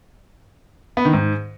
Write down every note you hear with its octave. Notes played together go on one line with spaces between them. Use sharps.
B3
D#3
G#2